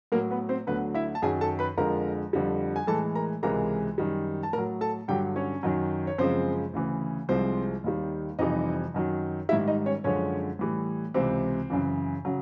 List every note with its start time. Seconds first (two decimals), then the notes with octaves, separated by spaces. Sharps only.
0.12 A2 F#3 A#3 A#4
0.31 B3 B4
0.49 C4 C5
0.67 D2 D3 F#3 B3 B4
0.95 E4 E5
1.15 A5
1.22 F#2 D#3 F#3 G#4 G#5
1.41 A4 A5
1.59 B4 B5
1.77 F2 D3 F3 G#3 A#4 A#5
2.33 F2 D3 G3
2.76 G#5
2.87 A2 E3 G#3 A4 A5
3.15 A#4 A#5
3.43 C#2 C3 E3 G#3 A#4 A#5
3.98 F#2 D#3 G3
4.43 A5
4.53 A2 A#4 A#5
4.58 F#3
4.81 A4 A5
5.08 G2 D3 F#3 G4 G5
5.36 C#4 C#5
5.63 F#2 D#3 F#3
6.07 C#5
6.18 F#2 C#3 F3 G#3 C4 C5
6.73 D2 C#3 E3
7.29 C2 C3 F3 G#3 C4 C5
7.84 D#2 D#3 G3
8.39 F2 C3 E3 G3 D#4 D#5
8.94 F#2 D#3 F#3
9.49 G#2 D#3 G3 E4 E5
9.67 D#4 D#5
9.86 C#4 C#5
10.04 F#2 D3 F3 G#3 C#4 C#5
10.59 A2 E3 G3
11.14 C#2 C3 E3 C4 C5
11.70 F#2 C#3 E3
12.25 C#3 F#3